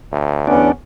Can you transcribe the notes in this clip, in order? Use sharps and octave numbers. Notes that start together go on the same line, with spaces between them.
D2
E2 B3 C#4 D4